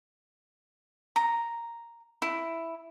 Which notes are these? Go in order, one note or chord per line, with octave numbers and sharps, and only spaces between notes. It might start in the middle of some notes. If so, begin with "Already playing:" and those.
A#5
E4